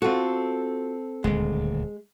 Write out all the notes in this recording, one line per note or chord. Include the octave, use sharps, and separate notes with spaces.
C4 F4 F#4 A4
D#1 D2 G#3